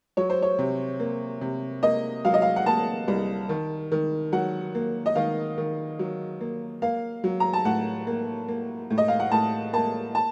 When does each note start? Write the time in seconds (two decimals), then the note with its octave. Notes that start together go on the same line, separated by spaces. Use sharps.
0.17 F#3 C#5
0.30 C5
0.42 C#5
0.59 C3
1.00 A#3
1.41 C3
1.83 A#3 D#5
2.25 F#3 F5
2.34 D#5
2.42 F5
2.56 F#5
2.66 A#3 A5
3.08 C2
3.49 D#3
3.92 D#3
4.32 F#3 F#5
4.75 A#3
5.06 D#5
5.15 D#3 F5
5.58 D#3
5.99 F#3
6.41 A#3
6.82 A#3 F5
7.24 F#3
7.40 A#5
7.53 A5
7.65 A2 F#5
8.07 A#3
8.48 A#3
8.90 A2
8.98 D#5
9.08 F5
9.20 F#5
9.32 A2 A5
9.73 A#3 A5
10.15 A5